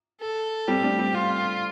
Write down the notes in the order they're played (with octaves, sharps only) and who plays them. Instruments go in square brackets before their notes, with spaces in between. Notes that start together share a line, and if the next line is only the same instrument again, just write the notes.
[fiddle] A4
[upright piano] G3 C4 [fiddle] G4
[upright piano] A3 D4
G3 C4
[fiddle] F4